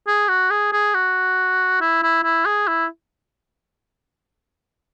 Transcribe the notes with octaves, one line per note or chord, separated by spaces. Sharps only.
G#4
F#4
G#4
G#4
F#4
E4
E4
E4
G#4
E4